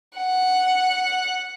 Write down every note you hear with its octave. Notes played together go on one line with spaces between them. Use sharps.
F#5